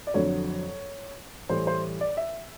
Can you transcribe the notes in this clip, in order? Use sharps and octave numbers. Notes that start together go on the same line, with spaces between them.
D5
F2 D3 F#3 C#5
A2 E3 G3 C5
C5
D5
E5